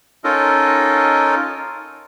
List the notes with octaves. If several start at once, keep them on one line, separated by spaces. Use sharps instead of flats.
C#4 D#4 F4 A4 A#4 D#5